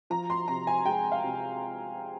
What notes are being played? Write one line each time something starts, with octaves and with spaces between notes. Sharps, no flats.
F3 A#5
C6
C3 A#5
G#5
G#3 G5
F5
C3